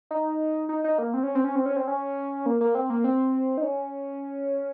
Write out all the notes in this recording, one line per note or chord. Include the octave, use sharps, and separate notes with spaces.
D#4
D#4
D#4
A#3
C4
C#4
C4
C#4
C4
C#4
C4
C#4
A#3
A#3
C4
A#3
C4
D#4
C#4